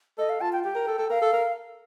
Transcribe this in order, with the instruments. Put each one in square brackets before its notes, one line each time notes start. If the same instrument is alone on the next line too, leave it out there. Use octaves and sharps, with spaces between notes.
[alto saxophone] A4 [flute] D#5
[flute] F5
[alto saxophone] F4 [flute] A5
[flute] G5
[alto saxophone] G4 [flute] G5
[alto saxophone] A#4
A4
A4
[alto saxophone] A#4 [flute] F5
[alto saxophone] A4
A#4